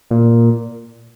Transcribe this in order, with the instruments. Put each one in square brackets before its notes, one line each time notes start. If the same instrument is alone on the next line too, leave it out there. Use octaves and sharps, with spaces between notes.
[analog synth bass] A#2